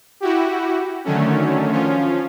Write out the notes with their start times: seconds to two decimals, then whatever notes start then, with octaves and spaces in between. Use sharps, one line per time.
0.20 E4 F#4 G4
1.05 D3 D#3 F#3 A3 C#4
1.72 F3 C#4 F4